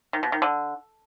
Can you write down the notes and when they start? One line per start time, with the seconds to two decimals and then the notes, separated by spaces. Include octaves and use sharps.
0.13 D#3
0.23 B2
0.32 D#3
0.42 D3